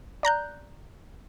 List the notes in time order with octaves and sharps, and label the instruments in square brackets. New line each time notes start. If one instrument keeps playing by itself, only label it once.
[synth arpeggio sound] D5 A#5 F#6 G6